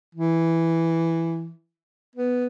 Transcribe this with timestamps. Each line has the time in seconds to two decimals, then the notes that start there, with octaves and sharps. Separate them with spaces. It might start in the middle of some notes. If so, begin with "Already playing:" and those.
0.15 E3
2.15 B3